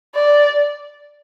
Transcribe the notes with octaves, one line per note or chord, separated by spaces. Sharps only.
D5